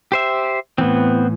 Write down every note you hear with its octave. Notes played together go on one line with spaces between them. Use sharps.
G4 C5 E5
A2 E3 B3 C4